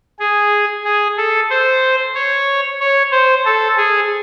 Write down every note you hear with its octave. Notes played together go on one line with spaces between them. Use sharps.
G#4
G#4
A4
C5
C#5
C#5
C5
A4
G#4